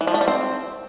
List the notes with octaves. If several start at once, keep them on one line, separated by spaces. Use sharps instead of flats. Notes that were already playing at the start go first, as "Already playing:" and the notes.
E3
F3
A3
G3
C4